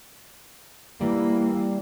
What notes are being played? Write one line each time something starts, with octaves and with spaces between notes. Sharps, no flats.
E3 G3 A#3